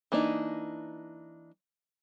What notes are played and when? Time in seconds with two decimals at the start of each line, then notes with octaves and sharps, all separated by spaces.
0.12 E3 A#3 D4 D#4